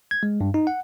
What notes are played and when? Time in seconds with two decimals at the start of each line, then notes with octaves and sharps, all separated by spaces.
0.11 G#6
0.23 G#3
0.41 G2
0.54 D#4
0.67 F#5